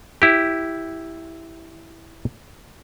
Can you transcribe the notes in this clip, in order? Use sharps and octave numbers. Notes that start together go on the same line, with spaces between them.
E4 G4